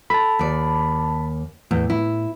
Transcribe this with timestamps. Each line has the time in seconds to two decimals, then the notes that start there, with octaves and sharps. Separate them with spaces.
0.10 A4 A5 B5
0.39 D#2 D5
1.71 E2 A2
1.90 E4